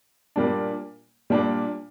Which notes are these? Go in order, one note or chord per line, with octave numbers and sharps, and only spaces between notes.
A#2 G3 A#3 D4
A#2 G3 A#3 D4